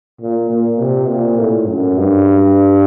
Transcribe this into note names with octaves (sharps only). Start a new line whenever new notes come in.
A#2
A#2
C3
A#2
A2
F#2
G2